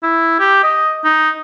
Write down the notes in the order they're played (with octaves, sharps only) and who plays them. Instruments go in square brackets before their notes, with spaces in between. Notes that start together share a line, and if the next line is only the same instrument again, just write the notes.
[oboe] E4
G4
D#5
D#4